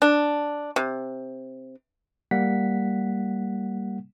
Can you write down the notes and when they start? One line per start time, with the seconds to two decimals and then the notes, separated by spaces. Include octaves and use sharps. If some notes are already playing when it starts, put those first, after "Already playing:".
0.02 D4
0.76 C3
2.31 G3 A#3 F#5 B6